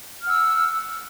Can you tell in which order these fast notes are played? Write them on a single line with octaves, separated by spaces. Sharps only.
F6 F#5 E6